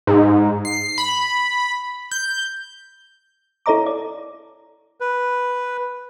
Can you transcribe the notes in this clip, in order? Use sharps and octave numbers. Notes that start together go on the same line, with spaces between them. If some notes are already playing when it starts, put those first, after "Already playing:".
G#2
C7
B5
G6
E4 A4 C#5 D#5 A#5 D6
D5
B4